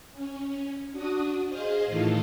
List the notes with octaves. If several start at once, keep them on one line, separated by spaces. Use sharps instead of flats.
C#4
D4 F#4 D#6
G#4 C5 D#5 F5
A2 D#3 E3 F4 A4